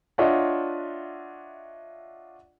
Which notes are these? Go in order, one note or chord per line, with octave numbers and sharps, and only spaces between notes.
D4 F4 C#5 D#5 E5 F#5